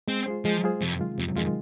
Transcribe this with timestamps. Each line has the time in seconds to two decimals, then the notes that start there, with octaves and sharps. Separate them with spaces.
0.08 G#3 C4
0.26 F4 G#4 C5
0.45 F3 G#3
0.64 F4 G#4 C5
0.81 F2 C3
0.99 D#3 G#3 F4
1.18 F2 C3
1.36 F2 D#3 G#3 F4